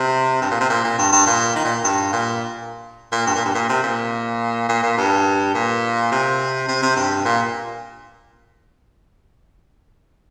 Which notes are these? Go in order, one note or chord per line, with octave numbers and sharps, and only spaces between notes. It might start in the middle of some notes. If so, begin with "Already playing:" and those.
Already playing: C3
G2
A#2
C3
A#2
A#2
G2
G2
A#2
D#3
A#2
G2
A#2
A#2
G2
A#2
G2
A#2
C3
A#2
A#2
A#2
G2
A#2
C3
C3
C3
G2
A#2